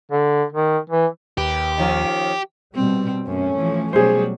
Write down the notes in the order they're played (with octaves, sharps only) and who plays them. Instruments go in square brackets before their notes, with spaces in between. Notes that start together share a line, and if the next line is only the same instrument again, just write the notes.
[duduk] D3
D#3
E3
[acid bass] D#2 [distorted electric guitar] G4 [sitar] B4
[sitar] D#3 F3 C#4
[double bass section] B2 G3 [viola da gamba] C4
[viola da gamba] F#2 [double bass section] A3 C#4
[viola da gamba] E3 F3
[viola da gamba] B2 F#3 G3 [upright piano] G#4 C5